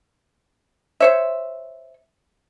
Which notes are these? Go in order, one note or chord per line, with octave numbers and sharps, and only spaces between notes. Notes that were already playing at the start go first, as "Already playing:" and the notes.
C5 C#5 E5